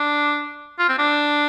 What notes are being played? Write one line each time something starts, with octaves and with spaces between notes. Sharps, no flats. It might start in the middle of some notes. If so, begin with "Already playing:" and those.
Already playing: D4
F4
C4
D4